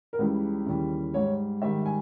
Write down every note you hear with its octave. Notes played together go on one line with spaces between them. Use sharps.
A#4
C#2 C#3 E3 G3 B4
D#2 C#3 E3 G3
G#2 G3 C#5
G#2 D#3 G3 E5
G#5